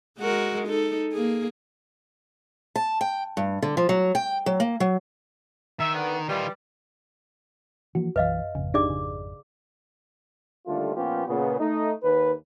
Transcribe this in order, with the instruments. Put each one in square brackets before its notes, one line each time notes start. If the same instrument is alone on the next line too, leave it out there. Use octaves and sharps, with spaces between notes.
[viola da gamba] G#3 F#4 A#4
D#4 A4
A#3 G#4
[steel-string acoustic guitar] A5
G5
G2
D3
F3
F#3
G5
F#3
A#3
F#3
[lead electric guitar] D#3 [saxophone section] E5
[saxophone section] D3 B3
[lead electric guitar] D#3 F4 [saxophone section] E3 G3
[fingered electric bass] E3 F3 A#3 [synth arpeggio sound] F#4
[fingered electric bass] B1 E3 [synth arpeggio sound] F#2 [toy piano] B4 D#5 F5
[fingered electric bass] G#1 F2 [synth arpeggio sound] C#3
[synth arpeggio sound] D4 D#4 G4 [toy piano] G#4 D5 D6
[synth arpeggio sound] C#3
[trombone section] D#2 D3 G3 A3 F4
A#2 F3 B3 C#4 F4 G4
A#2 C#3 B3
A3 D#4
D#2 B4